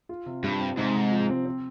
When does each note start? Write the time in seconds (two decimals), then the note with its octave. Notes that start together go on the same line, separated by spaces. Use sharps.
0.09 F4
0.26 C3
0.43 G2 G3
0.60 C4
0.77 G#2 C3
0.95 C3
1.12 F3
1.29 C4
1.46 C4